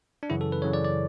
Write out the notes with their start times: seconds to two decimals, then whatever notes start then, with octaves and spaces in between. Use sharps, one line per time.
0.23 D4
0.30 F#2 C#3 E3 E4
0.41 A4
0.52 B4
0.62 F#2 C#3 E3 C#5
0.73 D5
0.84 D5